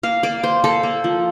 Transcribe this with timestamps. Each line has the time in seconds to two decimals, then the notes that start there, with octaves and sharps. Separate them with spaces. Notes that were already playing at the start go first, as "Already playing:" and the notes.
0.03 A#3 F5
0.23 A#3 D5
0.43 A#3 C5
0.64 A#3 A4
0.83 A#3
1.04 F3